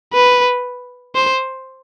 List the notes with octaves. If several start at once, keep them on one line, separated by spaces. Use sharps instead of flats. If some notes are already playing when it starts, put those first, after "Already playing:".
B4
C5